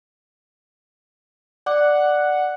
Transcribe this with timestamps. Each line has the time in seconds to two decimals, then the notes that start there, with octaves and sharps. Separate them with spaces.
1.66 D5 F#5 D6